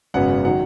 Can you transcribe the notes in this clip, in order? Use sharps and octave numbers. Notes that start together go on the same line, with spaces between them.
G#1 F#2 C#3 F#3 B3 F#5
D#3 F#3 F#5